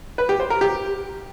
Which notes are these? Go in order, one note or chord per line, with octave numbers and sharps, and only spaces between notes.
B4
G4
C5
A#4
G4